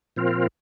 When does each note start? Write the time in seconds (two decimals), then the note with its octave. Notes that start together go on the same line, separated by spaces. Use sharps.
0.16 A#2 F3 C4 F4 A#4